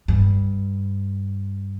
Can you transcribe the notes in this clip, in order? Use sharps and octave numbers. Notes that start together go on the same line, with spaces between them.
G2